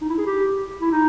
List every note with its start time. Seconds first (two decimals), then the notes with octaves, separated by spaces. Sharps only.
0.01 D#4
0.09 E4
0.18 G#4
0.26 G4
0.81 E4
0.92 D#4